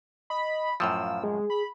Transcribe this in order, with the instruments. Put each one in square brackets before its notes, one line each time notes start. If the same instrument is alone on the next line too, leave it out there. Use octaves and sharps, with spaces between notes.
[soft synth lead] D#5 [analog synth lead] B5
[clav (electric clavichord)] F#2 A2 F3 [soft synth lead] F5 [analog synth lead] E6
[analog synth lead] G#3 [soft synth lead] G#4
[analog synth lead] B5